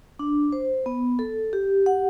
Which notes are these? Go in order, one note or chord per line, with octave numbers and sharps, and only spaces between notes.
D4
C5
B3
A4
G4
F#5